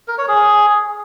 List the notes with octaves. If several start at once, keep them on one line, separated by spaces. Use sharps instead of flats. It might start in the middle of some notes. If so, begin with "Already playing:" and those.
A#4
C#5
G#4